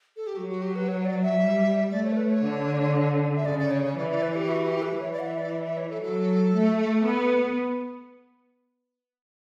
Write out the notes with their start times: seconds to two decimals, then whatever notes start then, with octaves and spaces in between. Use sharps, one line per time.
0.17 A4
0.27 G4
0.36 F#3 F#4
0.49 F#4
0.62 G4
0.76 B4
0.88 C#5
1.05 D5
1.22 E5
1.40 G3
1.91 A3 D5
2.04 C#5
2.13 A4
2.17 B4
2.30 C#5
2.43 D3
3.36 E5
3.45 C#3 D5
3.59 D5
3.71 C#5
3.84 C#5
3.97 E3 D5
4.10 D5
4.23 B4
4.36 G4
4.49 F#4
4.66 G4
4.82 B4
5.00 E3 C#5
5.13 D5
5.19 F#5
5.26 E5
5.38 D5
5.51 E5
5.64 E5
5.77 C#5
5.90 A4
6.02 F#3 A4
6.55 A3
7.06 B3